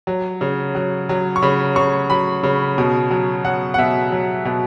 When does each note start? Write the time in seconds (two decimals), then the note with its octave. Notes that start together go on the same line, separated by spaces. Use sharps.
0.07 F#3
0.41 C#3
0.75 F#3
1.09 F#3
1.36 C#6
1.42 C#3 B5
1.76 C#3 C#6
2.10 F#3 B5
2.43 C#3
2.78 B2
3.11 F#3
3.45 F#3 F#5
3.74 F#5
3.78 B2 E5
4.12 F#3
4.45 B2